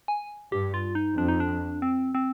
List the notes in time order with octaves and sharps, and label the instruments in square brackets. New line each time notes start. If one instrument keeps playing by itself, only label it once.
[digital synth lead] G#5
[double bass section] G2 [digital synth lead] G4
[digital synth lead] F4
D#4
[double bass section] F2 [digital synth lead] D4
[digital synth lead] D#4
D4
C4
C4